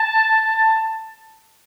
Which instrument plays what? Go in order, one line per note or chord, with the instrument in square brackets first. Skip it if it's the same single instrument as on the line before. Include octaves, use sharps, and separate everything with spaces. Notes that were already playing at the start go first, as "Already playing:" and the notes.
Already playing: [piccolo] A5